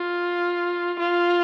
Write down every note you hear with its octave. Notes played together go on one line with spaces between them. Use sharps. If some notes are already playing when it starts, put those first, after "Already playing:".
Already playing: F4
F4